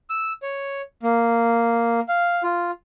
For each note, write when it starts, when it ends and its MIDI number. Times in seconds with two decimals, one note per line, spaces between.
0.10 0.33 88
0.43 0.82 73
1.03 2.00 58
2.09 2.43 77
2.43 2.71 65